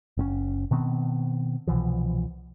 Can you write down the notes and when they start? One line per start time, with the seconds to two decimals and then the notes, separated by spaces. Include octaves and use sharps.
0.17 F#1 C4 C#4
0.71 B2 D#3 B3 C4
1.67 C2 B2 E3 F3